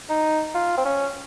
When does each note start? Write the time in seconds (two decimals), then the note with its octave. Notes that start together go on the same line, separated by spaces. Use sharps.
0.10 D#4
0.55 F4
0.78 C4
0.85 C#4